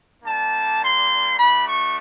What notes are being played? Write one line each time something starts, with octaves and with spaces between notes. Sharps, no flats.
G3 A#3 D4 A5
C6
A3 D4 F#4 B5
C#6